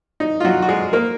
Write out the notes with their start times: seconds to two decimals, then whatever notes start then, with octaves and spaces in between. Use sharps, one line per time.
0.20 D#4
0.40 F4
0.44 F#3 F#4
0.62 F#4
0.69 G#3 G#4
0.93 A#3 A#4